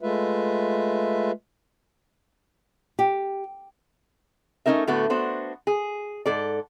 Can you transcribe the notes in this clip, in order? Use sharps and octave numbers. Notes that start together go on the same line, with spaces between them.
G#3 A3 F4 B4 E5
G4
A3 C#4 D#4 A#4 E5
A2 D3 A3 B3 F#4
B3 D4 F#4 C5
G#4
G#2 A4 D5